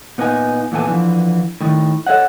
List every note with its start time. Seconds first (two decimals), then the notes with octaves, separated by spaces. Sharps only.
0.18 A#2 B3 D4 D#4 G#5
0.72 E2 A#2 B3 A4 G#5
0.87 D3 E3 F3
1.61 A2 D#3
2.07 A4 C#5 D#5 F#5